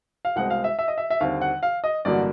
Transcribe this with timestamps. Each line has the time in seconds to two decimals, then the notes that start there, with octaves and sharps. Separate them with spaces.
0.25 F5
0.36 C2 B2 G#3 C4 F#5
0.50 F5
0.64 E5
0.79 E5
0.88 D#5
0.98 E5
1.10 E5
1.20 D#2 D3 G3 C4 F5
1.41 F#5
1.63 F5
1.84 D#5
2.05 A1 G2 D3 F#3 A#3 D5